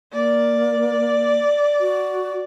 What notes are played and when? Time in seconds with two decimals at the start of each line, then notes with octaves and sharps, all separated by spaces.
0.13 A#3 D5
1.80 F#4